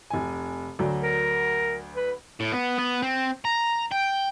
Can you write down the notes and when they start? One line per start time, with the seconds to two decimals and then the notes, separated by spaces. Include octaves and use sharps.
0.10 F1 G#5
0.79 D2 F#3 D4
1.03 A#4
1.96 B4
2.40 A2
2.52 B3
2.79 B3
3.02 C4
3.45 A#5
3.92 G5